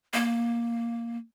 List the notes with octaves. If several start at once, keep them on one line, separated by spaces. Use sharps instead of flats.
A#3